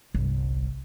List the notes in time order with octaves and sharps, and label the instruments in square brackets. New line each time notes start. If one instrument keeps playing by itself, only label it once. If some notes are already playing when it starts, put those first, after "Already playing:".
[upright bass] G1 C2